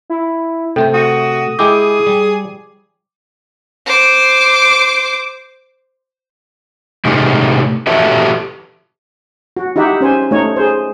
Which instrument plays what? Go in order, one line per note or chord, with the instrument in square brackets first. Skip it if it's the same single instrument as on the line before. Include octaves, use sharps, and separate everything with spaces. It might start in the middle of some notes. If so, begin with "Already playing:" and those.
[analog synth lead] E4
[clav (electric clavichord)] C3 A3 C5 [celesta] A4 [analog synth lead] G5
[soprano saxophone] F#4 [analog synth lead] D#6
[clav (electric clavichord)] G#3 E4 G4 [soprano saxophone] G#4 [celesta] D6
[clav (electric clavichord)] G3
[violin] C5 D6
[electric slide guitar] A2 C3 G#3 A3 D#4 G4
F#4 G4 A4 B4 E5
[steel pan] F#4
D#4 E4 G4 E5 F#5
C#4 C5 G#5
A3 D#4 C#5
G#4 C5